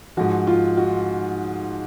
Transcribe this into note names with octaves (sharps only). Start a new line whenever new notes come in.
G#2 F3 F#4
F4
F#4